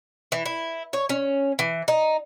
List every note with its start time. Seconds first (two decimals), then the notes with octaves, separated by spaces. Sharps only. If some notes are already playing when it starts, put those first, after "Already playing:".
0.32 E3
0.46 E4
0.93 C#5
1.09 C#4
1.59 E3
1.88 D#4